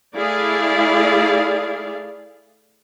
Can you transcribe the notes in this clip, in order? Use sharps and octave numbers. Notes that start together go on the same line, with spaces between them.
A3 E4 G#4 D5 F5